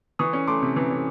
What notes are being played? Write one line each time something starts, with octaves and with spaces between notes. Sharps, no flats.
E3 C#6 D#6
C#4
A3 C6 D6
C3
E3
C#4